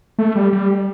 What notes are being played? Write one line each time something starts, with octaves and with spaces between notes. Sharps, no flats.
A3
G3
G3